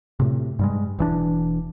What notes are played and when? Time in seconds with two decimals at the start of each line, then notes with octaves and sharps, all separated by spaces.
0.20 A2 C3
0.59 G2 G3 G#3
0.99 E1 E3 D4